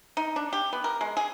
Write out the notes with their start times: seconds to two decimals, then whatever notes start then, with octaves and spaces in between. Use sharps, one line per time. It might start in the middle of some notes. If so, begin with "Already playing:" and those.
0.17 D#4
0.36 D4
0.53 G4
0.73 B3
0.84 A#4
1.01 G#3
1.17 G#4